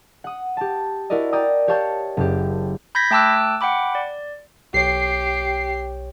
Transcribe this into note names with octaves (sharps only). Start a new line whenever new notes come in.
F#5 D#6
G4 A5
E4 F#4 A#4 D5 D#5
D5 G5 A#5 D#6
G4 C#5 F5 A5 C#6 G6
F#1 G4
B5 G6 G#6 A#6 B6
A3 G5 A5 D6 E6 F#6
F#5 G5 B5 D6
D5
B1 G4 C#5 C7